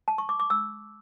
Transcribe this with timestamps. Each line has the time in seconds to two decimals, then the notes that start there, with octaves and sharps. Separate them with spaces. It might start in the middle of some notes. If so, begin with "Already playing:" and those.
0.08 A5
0.18 C#6
0.29 D6
0.40 D6
0.50 E6